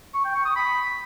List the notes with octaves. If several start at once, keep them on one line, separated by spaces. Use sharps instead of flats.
C#6
G5
C#6
D#6
B5